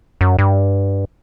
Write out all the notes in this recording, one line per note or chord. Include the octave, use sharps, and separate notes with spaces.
F#2
G2